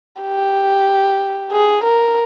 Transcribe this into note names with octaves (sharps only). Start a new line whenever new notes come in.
G4
G#4
A#4